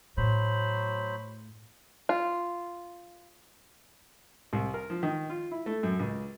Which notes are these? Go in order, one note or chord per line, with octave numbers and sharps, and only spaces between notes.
A2 F#3 C5 B5
F4
C2
A#4
F3
D#3
F4
E4
A3
F#2
C#2